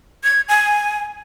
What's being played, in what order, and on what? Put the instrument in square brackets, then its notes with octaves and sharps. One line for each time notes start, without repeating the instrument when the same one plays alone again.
[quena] G#6
G#5